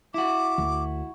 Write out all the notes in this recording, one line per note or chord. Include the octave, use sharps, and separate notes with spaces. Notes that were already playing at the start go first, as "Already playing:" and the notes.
E4 F#4 D6
D2